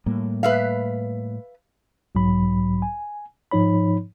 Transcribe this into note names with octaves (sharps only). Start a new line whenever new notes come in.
A2 G3 A#3
B4 E5 F5
B1 G#2 F#3 B5
G#5
G#2 F3 D#4 C#5 B5